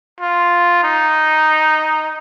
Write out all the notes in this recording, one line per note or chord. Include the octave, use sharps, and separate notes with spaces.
F4
D#4